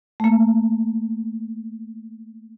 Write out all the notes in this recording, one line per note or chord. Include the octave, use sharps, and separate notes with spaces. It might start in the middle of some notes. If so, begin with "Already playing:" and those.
A3 A#3